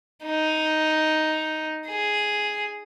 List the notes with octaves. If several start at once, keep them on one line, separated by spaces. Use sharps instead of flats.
D#4
G#4